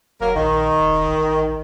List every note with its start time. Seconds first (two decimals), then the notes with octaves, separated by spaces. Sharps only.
0.20 E1 F#3 A#3 A#4
0.35 A#1 D#3
0.80 E1
1.08 A1